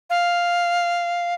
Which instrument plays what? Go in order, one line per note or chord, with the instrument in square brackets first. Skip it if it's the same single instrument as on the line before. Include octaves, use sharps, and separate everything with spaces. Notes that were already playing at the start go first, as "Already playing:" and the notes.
[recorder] F5